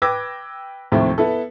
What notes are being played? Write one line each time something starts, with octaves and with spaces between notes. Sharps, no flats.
B4 G5 D6 E6 G#6 A#6
D#2 A2 C3 F3 A3 C4
B3 E4 A4